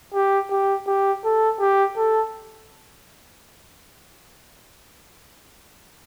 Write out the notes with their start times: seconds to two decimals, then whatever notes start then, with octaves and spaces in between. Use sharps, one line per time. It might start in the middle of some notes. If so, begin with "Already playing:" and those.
0.14 G4
0.50 G4
0.87 G4
1.24 A4
1.60 G4
1.97 A4